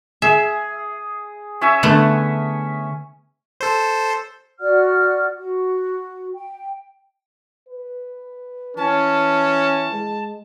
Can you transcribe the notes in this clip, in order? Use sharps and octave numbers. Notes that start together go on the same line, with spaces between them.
G#4 E5
C#4 E5 G#5
D3 A3 B3
A4 C5
F#4 D5 F#5 F6
F#4
G5
B4
E3 C#4 A5
G#3